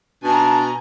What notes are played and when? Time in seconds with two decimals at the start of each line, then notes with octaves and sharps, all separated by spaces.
0.24 B2 D4 G#5 A#5